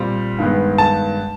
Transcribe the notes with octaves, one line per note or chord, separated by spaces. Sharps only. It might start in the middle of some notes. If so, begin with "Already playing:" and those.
Already playing: A#2 G3 C4
G2 D#3 G#3 B3
A5